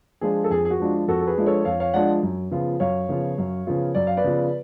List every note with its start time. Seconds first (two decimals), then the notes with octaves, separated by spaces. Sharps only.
0.21 F3 G#3 D4 F4 G#4
0.44 A4
0.50 F2 G#4
0.65 G#4
0.70 F#4
0.80 F3 G#3 D4 F4
1.08 F2 F#4 A4
1.21 A4
1.27 G#4 B4
1.37 F3 G#3 D4 F4
1.46 A4 C#5
1.65 F2 C#5 F5
1.80 C#5 F5
1.94 F3 G#3 D4 F4 D5 F#5
2.23 F#2
2.51 C#3 F3 B3 F4
2.80 F#2 C#5 F5
3.09 C#3 F3 B3 F4
3.38 F#2
3.67 C#3 F3 B3 F4
3.95 F#2 D5
4.07 F5
4.17 B4 D5
4.24 C#3 F3 B3 F4